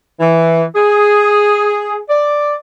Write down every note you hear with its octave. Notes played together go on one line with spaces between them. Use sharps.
E3
G#4
D5